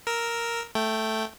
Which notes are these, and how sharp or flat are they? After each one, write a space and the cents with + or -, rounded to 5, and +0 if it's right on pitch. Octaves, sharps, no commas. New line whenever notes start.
A#4 +0 E6 -15
A3 +0 G5 -10